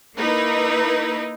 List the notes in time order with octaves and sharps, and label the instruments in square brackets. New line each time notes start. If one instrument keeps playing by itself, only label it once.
[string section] A#3 D#4 E4 A#4 B4